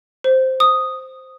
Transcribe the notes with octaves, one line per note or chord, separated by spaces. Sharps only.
C5
D#6